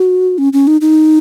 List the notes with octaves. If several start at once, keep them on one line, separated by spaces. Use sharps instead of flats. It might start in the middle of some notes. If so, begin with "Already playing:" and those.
Already playing: F#4
C#4
C#4
D#4
D#4